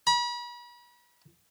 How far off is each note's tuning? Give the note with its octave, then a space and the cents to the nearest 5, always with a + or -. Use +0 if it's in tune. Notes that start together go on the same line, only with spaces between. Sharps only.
B5 -40